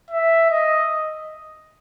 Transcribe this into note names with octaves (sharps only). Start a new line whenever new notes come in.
E5
D#5